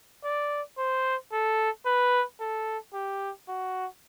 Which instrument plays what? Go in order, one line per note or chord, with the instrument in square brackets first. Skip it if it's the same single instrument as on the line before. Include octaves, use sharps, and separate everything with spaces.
[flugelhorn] D5
C5
A4
B4
A4
G4
F#4